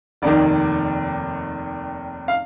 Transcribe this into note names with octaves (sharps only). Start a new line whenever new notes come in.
F1 D#2 D#3 D5
F5